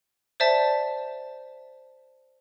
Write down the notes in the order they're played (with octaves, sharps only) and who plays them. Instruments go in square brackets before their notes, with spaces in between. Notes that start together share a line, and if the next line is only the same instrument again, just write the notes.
[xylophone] C5 D5 E5 A5